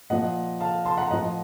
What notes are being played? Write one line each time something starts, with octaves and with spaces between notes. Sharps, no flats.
A#2 F3 D#5 F#5
F5 A5
A5 C6
F#5 A#5
A2 F3 D#5 F#5